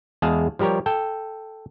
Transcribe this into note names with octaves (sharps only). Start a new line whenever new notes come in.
E2 G#3 G#4 F5 A5
F3 G3 G4 A#4 C#5
A4 G5